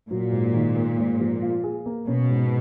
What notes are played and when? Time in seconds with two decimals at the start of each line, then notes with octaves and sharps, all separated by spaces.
0.10 A#2 F#3
0.32 G#2
0.54 D#3
0.76 A#3
0.98 G#2
1.20 F3
1.42 F4
1.64 G#4
1.86 A#3
2.07 B2 C#4
2.30 G#2